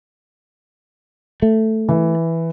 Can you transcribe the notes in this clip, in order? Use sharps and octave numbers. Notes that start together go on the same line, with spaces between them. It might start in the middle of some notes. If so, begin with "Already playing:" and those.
A3
E3